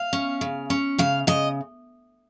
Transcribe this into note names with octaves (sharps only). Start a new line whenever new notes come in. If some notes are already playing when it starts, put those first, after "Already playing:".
Already playing: F5
C#4
C#3
C#4
C#3 F5
C#3 D#5